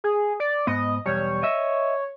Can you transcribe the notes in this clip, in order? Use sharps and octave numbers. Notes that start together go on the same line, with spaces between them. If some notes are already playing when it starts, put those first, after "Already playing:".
G#4
D5
G#2 B3 D#5
B1 E2 G3 C#5
D#5 E5